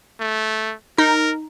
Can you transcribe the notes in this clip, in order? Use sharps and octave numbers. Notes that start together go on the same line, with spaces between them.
A3
D#4 A#4